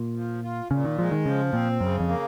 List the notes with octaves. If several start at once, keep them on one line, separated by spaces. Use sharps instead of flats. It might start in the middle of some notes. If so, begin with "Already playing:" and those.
Already playing: A#2
F3
F4
A#2 C#3
D#3
F3 G#3
D#3
C#3 F3
A#2 C4
F#2 C#3
F2
A#3